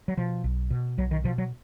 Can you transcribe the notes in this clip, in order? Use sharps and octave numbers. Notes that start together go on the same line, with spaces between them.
F#3
B2 F3
B1
B2
B1 F#3
D#3
B2 F3
F#3